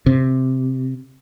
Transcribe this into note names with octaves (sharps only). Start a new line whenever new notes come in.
C3